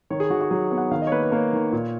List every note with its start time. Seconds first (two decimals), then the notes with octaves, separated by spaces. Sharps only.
0.10 D#3 C#5
0.20 G#4
0.30 D#3 F#4
0.41 F#4
0.51 F#3 G#4
0.71 B3
0.78 F#5
0.91 D#3 F5
1.02 D#5
1.07 C#5
1.12 A#3 B4
1.22 B4
1.32 A#3 C#5
1.53 D#3
1.72 A#2